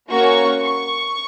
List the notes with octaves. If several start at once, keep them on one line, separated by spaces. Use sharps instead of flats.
A#3 C#4 F#4 C#6
C#6